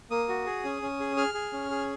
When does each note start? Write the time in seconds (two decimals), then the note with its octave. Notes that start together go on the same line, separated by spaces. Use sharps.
0.11 A#3 D#6
0.29 F#4
0.46 G#4
0.64 C#4
0.82 C#4
1.00 G#4
1.17 G#4 F6
1.34 G#4
1.52 C#4
1.70 G#4